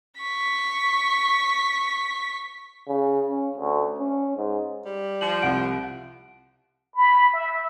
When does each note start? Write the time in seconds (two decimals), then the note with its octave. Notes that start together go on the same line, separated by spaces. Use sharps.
0.20 C#6 B6
2.88 C#3
3.26 C#4
3.58 D2
3.98 C#4
4.37 G#2
4.85 G3
5.21 F3 F#7
5.42 C2 F#5 D7
6.95 B5
7.34 E5